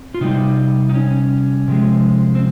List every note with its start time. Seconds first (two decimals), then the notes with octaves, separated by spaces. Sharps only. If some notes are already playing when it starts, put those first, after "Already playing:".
Already playing: C4
0.14 F4
0.21 C3 G3 D#4
0.89 D#4
0.94 C#4
1.68 C3 F3 G#3
2.35 C4